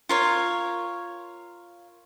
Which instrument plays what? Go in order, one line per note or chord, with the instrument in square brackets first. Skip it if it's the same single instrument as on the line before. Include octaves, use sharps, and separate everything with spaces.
[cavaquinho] F4 A#4 C#5